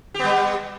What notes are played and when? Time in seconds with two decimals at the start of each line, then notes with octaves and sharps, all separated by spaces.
0.14 G4
0.19 B3
0.24 G3